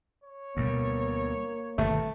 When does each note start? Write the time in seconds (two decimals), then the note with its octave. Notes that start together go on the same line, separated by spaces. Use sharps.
0.24 C#5
0.57 D2 B2 G3 A#3
1.78 G1 B2 D#3 A3